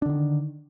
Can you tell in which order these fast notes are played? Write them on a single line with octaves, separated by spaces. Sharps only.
D4 D3 D#3